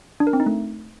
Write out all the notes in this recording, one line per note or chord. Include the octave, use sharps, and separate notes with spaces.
D4
A#4
C4
D#4
A3